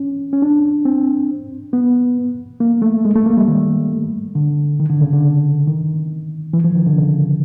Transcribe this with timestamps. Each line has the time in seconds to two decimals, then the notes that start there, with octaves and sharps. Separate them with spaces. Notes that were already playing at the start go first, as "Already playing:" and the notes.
Already playing: C#4
0.33 C#4
0.42 D4
0.85 C4
1.73 B3
2.60 A#3
2.82 A3
3.05 G#3
3.16 A3
3.26 A#3
3.37 G3
3.48 D#3
4.35 D3
4.80 D#3
4.90 D3
5.01 C#3
5.13 D3
5.67 D#3
6.53 E3
6.64 F3
6.75 D#3
6.87 D3
6.98 C#3